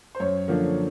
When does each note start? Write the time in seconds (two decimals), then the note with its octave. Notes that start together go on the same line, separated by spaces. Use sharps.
0.15 C5
0.20 F#2 C#5
0.48 D3 F3 A#3